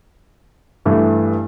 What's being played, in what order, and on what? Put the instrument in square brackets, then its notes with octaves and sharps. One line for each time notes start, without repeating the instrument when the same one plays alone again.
[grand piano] G2 E3 A3